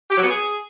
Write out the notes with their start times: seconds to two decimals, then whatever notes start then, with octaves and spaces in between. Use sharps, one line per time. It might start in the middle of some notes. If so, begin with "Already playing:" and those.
0.10 G4
0.17 F#3
0.23 B3
0.30 G#4